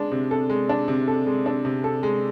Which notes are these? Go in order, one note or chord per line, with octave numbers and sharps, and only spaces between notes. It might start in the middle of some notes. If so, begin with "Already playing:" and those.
Already playing: G#3 D4
C3
A4
G#3
D4
C3
A4
G#3
D4
C3
A4
G#3